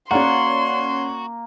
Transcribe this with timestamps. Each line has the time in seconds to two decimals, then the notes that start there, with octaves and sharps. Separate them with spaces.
0.11 A#3 C#4 F#4 D5 F#5 C6